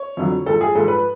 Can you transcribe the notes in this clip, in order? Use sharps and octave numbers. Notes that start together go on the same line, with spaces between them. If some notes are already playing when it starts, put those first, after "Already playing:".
Already playing: C#5
F2 D3 F#3
G#2 F3 A4
G#4
G#2 F3 A4
B4